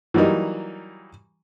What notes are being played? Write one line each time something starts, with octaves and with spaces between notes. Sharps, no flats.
E3 F#3 G3 A#3 D#4